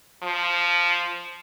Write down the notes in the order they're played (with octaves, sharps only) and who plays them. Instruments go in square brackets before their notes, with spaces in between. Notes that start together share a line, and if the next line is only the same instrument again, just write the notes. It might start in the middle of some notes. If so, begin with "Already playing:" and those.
[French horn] F3